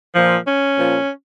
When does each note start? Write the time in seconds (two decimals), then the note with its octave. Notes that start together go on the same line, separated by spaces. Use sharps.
0.15 A#2 F3
0.45 C#4
0.75 A#2 F3